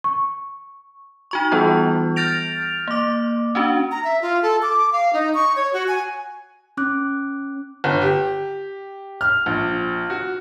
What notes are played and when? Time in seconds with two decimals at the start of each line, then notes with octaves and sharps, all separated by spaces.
0.04 C#6
1.31 D#4 F#4 C#6
1.52 E3 G3 B3 F4
2.16 F6 G6 A6 A#6 D7 F7
2.88 A#3 D6
3.55 C#4 D4 F#4
3.91 A#5
4.04 E5
4.22 F4
4.42 A4
4.62 D6
4.92 F5
5.13 D#4
5.34 C#6
5.56 C#5
5.73 F#4
5.88 G#5
6.77 C#4 D6 F#6
7.84 G1
8.02 G4
9.21 F6
9.46 A#1
10.10 F#4